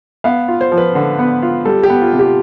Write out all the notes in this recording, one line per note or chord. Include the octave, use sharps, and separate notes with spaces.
B3 F5
F4
C5
F3
B4
D3
B3
F4
G3 A4
G4
B3
F4
C3
G4